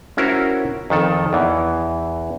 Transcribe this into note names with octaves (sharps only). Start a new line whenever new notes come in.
C#4 E4 F#4 A#4 C5
F2 D#3 A4
E2 E3